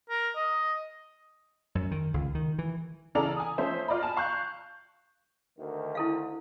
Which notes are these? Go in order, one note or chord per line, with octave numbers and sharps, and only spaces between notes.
A#4
D#5
F#2
D#3
C#2
D#3
E3
C#3 E3 A4 D5 A#5 F7
G#5 D#6
F3 A3 C#4 C5 E5
F4 D5 D#5 B5
G#5 A5 E7
F5 C#6 F#6 G6
D2 D#3
E4 A4 F5